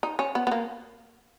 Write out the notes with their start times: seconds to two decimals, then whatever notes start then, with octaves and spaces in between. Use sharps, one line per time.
0.03 D#4
0.19 C#4
0.35 B3
0.47 B3
0.51 A#3